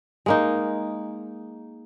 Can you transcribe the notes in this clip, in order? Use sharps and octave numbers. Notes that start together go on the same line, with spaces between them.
G#3 A#3 D#4